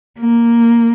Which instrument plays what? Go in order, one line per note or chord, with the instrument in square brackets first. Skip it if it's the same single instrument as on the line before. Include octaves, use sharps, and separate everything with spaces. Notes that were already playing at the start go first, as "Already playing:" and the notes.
[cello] A#3